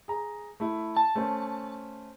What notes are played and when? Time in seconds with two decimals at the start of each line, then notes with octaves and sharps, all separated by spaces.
0.08 G#4 A#5
0.60 A3 E4
0.97 A5
1.15 A3 C#4 C5